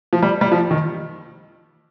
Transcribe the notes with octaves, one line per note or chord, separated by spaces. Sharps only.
F3
G3
G3
F3
D#3